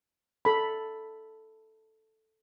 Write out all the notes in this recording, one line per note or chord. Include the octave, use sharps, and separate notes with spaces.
A4 B5